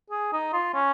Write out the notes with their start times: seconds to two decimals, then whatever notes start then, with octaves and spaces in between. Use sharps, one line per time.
0.11 G#4
0.33 D#4
0.53 F4
0.74 C#4